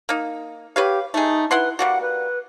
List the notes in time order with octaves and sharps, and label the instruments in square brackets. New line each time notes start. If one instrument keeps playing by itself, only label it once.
[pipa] A#3 D#4
[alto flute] G4 [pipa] B4 C#5 F5
[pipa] A3 G#4 [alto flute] D#4
[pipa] E4 F#5 C6 [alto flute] B4
[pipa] G3 A#3 F#4 [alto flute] F#5
[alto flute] B4